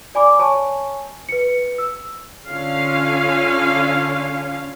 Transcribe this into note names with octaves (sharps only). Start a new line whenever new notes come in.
D5 G#5 B5 D6
C#5 G#5 A5 C#6
B4 C#7
E6
D3 C#4 F4 F5